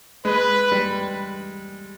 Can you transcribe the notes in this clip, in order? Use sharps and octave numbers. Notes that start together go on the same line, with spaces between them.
G#3 B4
G3